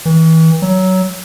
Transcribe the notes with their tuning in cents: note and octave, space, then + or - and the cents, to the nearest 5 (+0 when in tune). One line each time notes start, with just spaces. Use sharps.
E3 -35
F#3 +15